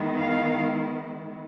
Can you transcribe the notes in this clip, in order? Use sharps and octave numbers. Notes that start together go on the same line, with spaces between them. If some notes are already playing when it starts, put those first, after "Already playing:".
Already playing: D#3 G#3 B3 E4
F5